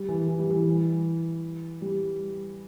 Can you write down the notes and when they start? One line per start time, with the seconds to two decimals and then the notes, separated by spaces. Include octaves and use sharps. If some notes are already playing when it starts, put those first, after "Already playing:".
Already playing: G3
0.08 E3
0.28 E3
0.39 G3
0.50 E3
1.81 G3